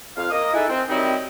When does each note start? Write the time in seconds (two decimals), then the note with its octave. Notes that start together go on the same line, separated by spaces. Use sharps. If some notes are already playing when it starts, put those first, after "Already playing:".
0.16 F2 F5
0.31 A#3 D#5 D#6
0.53 D#4 E4 G#4 A4 B4 E5
0.68 C4
0.88 D#3 F#3 G3 C4 D#4 E4